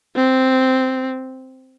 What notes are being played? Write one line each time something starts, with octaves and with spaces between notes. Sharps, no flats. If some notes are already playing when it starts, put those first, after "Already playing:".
C4